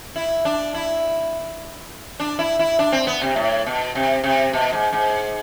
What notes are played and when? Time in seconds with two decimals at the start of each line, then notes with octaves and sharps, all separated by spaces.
0.16 E4
0.45 D4
0.74 E4
2.20 D4
2.39 E4
2.59 E4
2.79 D4
2.92 C4
3.07 B3
3.21 C3
3.36 A2
3.66 B2
3.95 C3
4.24 C3
4.53 B2
4.73 G#2
4.93 G#2